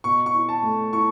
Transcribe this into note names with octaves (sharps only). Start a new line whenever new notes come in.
B2 C#6
C#6
E4
A5
A3
E4 C#6